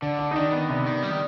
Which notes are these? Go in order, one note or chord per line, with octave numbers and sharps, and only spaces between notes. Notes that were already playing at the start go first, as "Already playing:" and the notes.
D3 D4
D4
D#4
D#3 D4
B3
C3 B3
D#3
G3
D#3